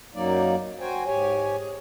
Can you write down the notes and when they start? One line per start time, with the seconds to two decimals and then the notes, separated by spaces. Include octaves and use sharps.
0.15 F#2 F#3 A#3 D#4 D5
0.80 F#4 C5 G5 G#5
1.06 G#2 G4 C#5 G#5
1.56 G#4